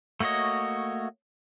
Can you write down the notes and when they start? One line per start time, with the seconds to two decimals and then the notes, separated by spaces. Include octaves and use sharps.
0.20 A3 A#3 F#4 C#5 D#5